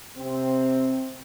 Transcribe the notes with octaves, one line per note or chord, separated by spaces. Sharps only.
C3 C4